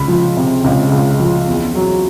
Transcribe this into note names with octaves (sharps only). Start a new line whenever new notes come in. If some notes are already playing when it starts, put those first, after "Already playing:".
Already playing: C#2 B5
F3
C3
C#2
C#2
F3
E2
F#3